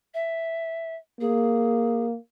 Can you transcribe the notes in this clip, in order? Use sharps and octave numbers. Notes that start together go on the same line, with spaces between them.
E5
A#3 G#4